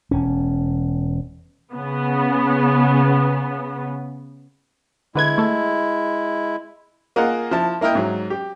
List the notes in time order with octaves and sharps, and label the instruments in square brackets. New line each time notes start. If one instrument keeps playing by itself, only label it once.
[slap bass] E1 C#4
[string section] C#3 B3
[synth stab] D3 B4 G#6 [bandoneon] G#3 E4
[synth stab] A3 A4
[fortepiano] A#3 F4 G#4 A#4 D#5 F#5
F3 E4 A5
A#3 E4 A#4 D#5 G5
G#2 F#3
G4